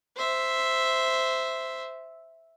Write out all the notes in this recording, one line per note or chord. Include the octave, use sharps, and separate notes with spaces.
C5 E5